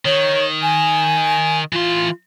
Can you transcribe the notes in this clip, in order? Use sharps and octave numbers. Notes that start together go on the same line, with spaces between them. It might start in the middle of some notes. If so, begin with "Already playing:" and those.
D#3 C#5
G#5
E3 F4 C6